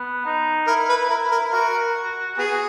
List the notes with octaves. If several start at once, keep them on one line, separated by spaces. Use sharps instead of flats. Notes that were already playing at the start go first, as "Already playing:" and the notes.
Already playing: B3
D#4
E4 A#4
B4
E4 A#4
A#4
E4
F#4 A#4
B3 G#4